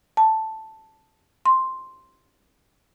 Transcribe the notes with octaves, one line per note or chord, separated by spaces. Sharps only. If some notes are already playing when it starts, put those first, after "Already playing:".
A5
C6